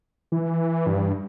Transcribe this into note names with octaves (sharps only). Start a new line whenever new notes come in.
E3
G2